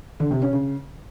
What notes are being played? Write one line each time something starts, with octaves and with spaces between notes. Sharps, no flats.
D3
C3
C#4
C#3